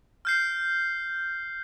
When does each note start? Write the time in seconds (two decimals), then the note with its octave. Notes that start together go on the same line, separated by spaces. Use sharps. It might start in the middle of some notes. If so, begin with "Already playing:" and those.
0.25 F6 G6 C7